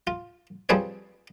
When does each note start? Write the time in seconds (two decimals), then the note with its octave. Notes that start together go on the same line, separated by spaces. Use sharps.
0.07 F4
0.69 F3 G3 C4 G#4 B4 C#5